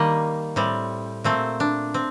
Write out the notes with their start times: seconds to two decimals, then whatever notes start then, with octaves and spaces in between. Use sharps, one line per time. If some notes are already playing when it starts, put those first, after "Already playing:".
Already playing: D#3 G3 A#3 D#5
0.56 A2 G3 C4
1.24 A#2 A3 C4 C5
1.60 D4
1.94 C4